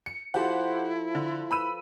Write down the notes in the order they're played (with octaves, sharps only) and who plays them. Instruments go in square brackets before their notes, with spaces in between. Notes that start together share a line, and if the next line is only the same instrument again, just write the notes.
[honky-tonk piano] C#7
[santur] F3 A4 C5 [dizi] E4 [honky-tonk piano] F#4 G4 F#5
[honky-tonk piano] D3
[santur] B4 [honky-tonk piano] B5 E6 D#7